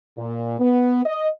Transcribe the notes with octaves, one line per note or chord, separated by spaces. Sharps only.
A#2
B3
D#5